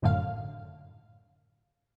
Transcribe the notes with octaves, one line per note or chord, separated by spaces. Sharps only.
G#1 F#2 A2 D3 F5